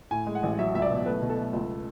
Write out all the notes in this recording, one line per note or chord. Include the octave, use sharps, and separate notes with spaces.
A2 G#5
G#3
F#5
A1
F#3 E5
C#2 E5
D5
B2
A3 B4
B2
A4
A3
C#2